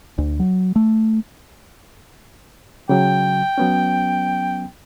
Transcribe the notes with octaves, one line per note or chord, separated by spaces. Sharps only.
D2
F#3
A3
C#3 F#3 G5
F#3 B3 C#4